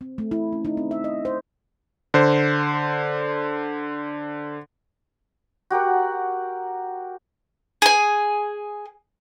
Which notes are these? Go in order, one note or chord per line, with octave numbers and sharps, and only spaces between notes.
C4
A3
E4
C#4
D#4
C4
E5
D#5
C5
D3 C5
F#4 G4 A#4 F#5
G#4 G#5